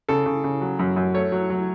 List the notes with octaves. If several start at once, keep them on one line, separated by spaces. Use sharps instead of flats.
C#3 A4
C#3
C#3
F#3
F#2
F#2
A3 C#5
F#3
F#3